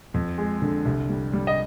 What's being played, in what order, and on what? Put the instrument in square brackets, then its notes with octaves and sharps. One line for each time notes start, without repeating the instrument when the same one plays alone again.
[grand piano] F2
G#3
D3
C2
G3
G3
D#5